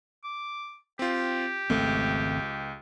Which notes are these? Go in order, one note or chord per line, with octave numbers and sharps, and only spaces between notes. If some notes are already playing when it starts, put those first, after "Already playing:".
D6
C4 F4 G4
G#1 C#2 A3 C4